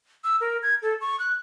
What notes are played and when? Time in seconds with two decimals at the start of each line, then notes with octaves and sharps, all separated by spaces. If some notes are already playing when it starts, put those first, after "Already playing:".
0.24 E6
0.41 A#4
0.63 G#6
0.82 A4
1.01 C#6
1.20 F#6